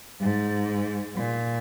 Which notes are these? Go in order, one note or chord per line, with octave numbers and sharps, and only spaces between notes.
G#2
A#2